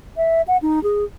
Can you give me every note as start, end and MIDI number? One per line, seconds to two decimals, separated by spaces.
0.17 0.42 76
0.48 0.57 78
0.62 0.82 63
0.83 1.04 68